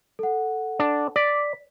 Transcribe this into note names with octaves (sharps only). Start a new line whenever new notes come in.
A4 F#5
D4
D5 B6